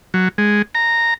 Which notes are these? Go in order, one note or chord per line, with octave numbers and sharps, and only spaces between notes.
F#3
G#3
A#5